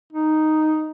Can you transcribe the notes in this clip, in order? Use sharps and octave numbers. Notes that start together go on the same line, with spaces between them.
D#4